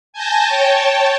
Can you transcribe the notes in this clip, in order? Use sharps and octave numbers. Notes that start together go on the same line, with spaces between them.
G#5 A5 G6 A#6
C#5 G5 A5